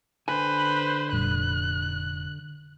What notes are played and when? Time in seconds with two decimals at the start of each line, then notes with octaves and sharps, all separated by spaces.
0.28 D3 B4 C5 G5 G#5
1.12 F1 A#2 G3 F#6